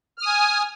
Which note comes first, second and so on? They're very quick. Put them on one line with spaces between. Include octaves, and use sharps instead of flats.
F6 D#6 G#5